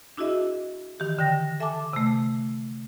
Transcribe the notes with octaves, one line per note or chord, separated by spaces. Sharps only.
D4 E4 F#4 G#4 D#5 E5
D#3 E3 G4
D3 G5 A#6
A4 E5 G#5 A5 D6
C3 A3